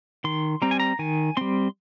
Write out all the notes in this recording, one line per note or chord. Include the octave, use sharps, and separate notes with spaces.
D#3 C6
G3 C4 A#5
G#5
A#5
D#3 G#5
G3 C4 C6